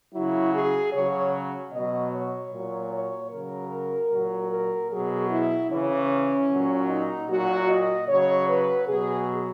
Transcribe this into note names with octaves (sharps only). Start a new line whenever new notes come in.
C#3 F#3 E4
G#4
C#3 F#3 C#5
B2 F#3 D#5
C#5
A#2 F#3
C#5
C#3 F#3 A#4
A#2 F#3
A#4
B2 F#3 G#4
E4
C#3 E3 C#4
A#2 F#3
D#4
A#2 F#3 F#4
D#5
C#3 F#3 C#5
B4
B2 F#3 G#4